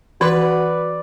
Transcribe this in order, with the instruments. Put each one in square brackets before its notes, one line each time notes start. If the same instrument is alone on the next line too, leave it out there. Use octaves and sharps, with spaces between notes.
[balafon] E3 [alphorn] F#4 [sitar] B4 [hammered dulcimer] D5